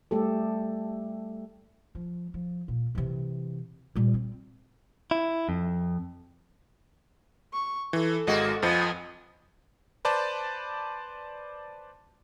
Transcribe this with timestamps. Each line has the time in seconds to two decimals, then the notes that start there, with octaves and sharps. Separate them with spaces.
0.11 G3 A3 G4 A4
1.95 F3
2.34 F3
2.68 A#2
2.95 C3 E3
3.96 A#2 G3
4.14 C4
5.11 E4
5.49 F2
7.52 C#6
7.93 E3 A4
8.27 G#1 G#3 A#3 F#4 D#5
8.62 F2 F3 B3 D#5 G#5
10.05 B4 C5 D5 A5